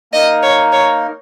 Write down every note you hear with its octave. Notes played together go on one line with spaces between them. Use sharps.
A#3 D#4 A#4 D#5
C#5
C#5